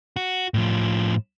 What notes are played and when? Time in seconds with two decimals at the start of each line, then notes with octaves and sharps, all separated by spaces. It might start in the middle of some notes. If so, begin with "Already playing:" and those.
0.16 F#4
0.54 A2 F3